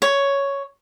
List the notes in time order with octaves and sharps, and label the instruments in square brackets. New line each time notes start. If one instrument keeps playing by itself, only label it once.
[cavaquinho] C#5